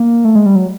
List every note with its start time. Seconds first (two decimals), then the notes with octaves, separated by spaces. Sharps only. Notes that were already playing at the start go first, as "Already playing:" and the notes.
Already playing: A#3
0.25 A3
0.35 G#3
0.46 G3
0.56 F#3